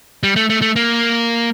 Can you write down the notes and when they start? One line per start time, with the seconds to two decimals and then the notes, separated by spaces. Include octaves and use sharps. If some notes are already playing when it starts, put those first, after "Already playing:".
0.23 G3
0.36 A3
0.50 A3
0.62 A3
0.76 A#3